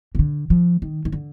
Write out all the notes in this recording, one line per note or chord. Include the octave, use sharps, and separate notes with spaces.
C3
D3
F3
D#3
D#3
D3